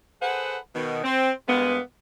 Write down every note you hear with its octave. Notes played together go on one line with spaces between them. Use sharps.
G#4 A4 B4 C5 F#5
B2 D#3
C4
G2 G#3 A#3 B3